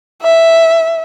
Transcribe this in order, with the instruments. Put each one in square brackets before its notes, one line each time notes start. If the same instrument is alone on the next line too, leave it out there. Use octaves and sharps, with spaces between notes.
[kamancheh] E5